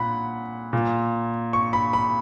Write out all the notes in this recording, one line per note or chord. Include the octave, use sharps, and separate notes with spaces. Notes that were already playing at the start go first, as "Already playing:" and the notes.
Already playing: A#2 F#5 B5
A#2
C#6
B5
B5